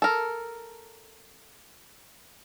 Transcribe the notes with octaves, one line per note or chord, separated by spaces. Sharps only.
A4 A#4